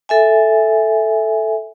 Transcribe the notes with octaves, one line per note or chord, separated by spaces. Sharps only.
A4 E5 G#5